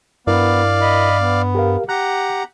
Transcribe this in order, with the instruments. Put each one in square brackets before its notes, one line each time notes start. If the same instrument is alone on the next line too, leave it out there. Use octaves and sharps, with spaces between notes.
[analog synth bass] G2 [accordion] B3 [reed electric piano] E4 A#4 [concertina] D5 F5
[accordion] D#5 B5
B3
[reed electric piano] G4 A#4 F5
[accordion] G4 F#5 [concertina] A#5 [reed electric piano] F#6